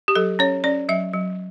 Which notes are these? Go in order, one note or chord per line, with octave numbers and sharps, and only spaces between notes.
G4
F#3 A4
C#4 C#5
C#4 D5
F#3 E5
F#3